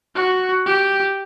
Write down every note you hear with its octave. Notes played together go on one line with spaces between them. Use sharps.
F#4
G4